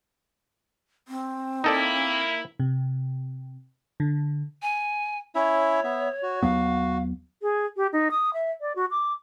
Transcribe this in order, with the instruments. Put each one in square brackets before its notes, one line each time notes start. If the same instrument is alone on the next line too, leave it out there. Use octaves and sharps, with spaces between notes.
[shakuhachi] C4
[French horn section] A#3 E4 [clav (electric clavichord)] D#4 A4 D5
[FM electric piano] C3
D3
[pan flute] G#5
[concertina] C#4 E4 E5 [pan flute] C#5
[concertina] B3 E5
F#4
[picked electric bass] D#2 F#3 B3 [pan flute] F5
[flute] G#4
G4
D#4
D#6
E5
D5
F#4
D6